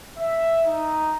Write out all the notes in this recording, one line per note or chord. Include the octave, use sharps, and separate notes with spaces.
E5
D#4